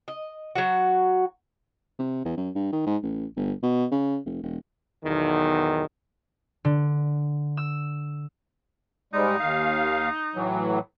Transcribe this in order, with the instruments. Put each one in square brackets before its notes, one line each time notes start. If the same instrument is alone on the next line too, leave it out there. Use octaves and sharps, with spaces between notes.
[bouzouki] D#5
F#3 F#4
[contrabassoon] C3
E2
F#2
G2
D#3
G#2
A1
G1
B2
C#3
F1
E1
[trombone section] B1 E2 D#3
[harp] D3
E6
[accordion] G#2 G3 G#3 [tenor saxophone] D#4
[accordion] D#2 F5
A2 E3 F#3